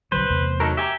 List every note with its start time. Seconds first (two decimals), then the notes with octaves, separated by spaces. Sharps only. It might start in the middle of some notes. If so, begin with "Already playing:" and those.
0.12 B1 D3 F#3 B4 C5
0.30 E2 C3 A3
0.60 F#3 D#4 A4 A#4
0.77 G4 E5 G#5 A#5